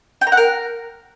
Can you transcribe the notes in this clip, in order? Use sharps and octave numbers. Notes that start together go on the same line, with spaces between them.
G5
A#5
F#5
A#4